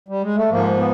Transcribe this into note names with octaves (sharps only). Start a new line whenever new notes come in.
G3
G#3
A3
G#2 F3 A#3
B3